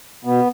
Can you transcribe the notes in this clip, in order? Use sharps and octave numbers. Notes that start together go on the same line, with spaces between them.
B2 B3